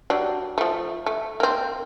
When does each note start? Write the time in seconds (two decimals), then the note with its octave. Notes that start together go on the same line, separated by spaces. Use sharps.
0.10 F#3 G3 D4
0.58 F3 A3
1.06 A3
1.40 A#3 C4